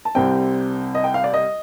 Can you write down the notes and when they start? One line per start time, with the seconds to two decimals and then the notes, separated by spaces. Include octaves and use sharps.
0.05 A5
0.15 C2 C3 G3 C4 G5
0.95 D#5
1.04 G5
1.14 F5
1.24 D5
1.34 D#5